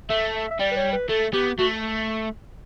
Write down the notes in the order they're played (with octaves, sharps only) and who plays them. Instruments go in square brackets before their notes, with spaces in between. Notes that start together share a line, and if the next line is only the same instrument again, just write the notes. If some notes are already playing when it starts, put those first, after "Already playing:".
[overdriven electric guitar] A3 [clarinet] E5
[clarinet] E5
E5
[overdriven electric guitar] G3 [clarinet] D5
[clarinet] B4
C#5
B4
[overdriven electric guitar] A3 [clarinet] A4
[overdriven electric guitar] B3 [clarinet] G4
[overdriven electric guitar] A3 [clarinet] F#4